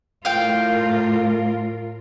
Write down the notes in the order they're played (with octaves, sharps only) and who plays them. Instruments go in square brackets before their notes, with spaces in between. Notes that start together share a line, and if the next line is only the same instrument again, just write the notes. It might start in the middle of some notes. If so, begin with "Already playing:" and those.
[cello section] A2 F4 A#4 [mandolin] F5 G5